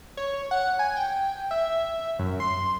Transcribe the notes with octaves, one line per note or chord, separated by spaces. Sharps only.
C#5
F#5
G#5
G5
E5
F#2
C6